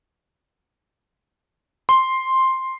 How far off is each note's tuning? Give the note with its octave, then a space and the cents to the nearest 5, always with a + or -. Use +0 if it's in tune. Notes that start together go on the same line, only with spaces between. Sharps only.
C6 +5